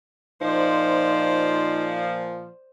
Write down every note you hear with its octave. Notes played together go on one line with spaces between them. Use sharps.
A#2 F3 D#4 C5 D5